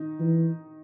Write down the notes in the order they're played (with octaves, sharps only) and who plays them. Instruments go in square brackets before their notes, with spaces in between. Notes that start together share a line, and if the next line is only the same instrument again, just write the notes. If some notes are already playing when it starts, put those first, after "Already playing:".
Already playing: [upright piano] D#3 D#4
[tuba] E3